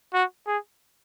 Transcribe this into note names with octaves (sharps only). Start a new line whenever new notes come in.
F#4
G#4